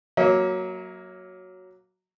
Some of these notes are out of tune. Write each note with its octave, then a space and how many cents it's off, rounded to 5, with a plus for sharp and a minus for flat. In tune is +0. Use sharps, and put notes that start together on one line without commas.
F#3 +0 A#3 +5 E5 -45